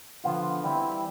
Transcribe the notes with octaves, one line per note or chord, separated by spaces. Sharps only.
D3 F3 B3 F4
E3 G3 C4 E4